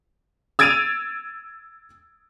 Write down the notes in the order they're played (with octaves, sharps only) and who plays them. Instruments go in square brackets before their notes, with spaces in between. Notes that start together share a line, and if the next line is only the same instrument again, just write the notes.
[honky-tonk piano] E6 G#6 A6 D7 D#7 F7